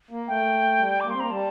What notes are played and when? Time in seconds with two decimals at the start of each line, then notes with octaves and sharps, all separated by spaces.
0.11 A#3
0.28 A3 G5
0.78 G3
1.00 A#3 D6
1.10 C4 C6
1.20 A#3 A#5
1.29 G3 A5